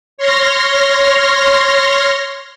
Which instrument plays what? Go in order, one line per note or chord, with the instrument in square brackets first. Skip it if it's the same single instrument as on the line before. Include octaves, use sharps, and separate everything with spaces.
[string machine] C#5 C6 F6 A#6